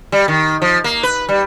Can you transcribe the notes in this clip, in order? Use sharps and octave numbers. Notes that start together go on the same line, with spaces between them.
G3
D#3
F3
A#3
B4
G3